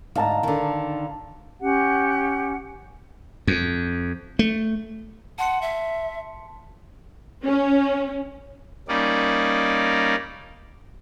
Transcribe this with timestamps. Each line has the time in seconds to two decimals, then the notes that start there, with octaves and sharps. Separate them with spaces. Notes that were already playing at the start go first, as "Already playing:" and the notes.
0.15 D2 G#2 F5 A5 A#5
0.43 D3 D#3
1.60 C#4 G4 F#5
3.47 F2
4.39 A3
5.38 F#5 A5 C6 C#7
5.62 E5
7.44 C#4
8.88 G3 A#3 C#4 D#4 D5